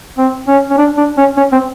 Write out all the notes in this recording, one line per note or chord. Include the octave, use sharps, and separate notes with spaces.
C4
C#4
C#4
D4
D4
C#4
C#4
C4